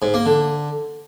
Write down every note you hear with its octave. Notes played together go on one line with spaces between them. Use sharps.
G#2
A#3
D3